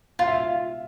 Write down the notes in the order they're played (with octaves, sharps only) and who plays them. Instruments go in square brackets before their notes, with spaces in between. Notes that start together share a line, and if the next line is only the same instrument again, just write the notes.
[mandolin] F4 [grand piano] F5
[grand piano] E5